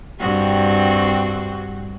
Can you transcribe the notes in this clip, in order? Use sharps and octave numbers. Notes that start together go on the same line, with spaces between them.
G2 C4 F#4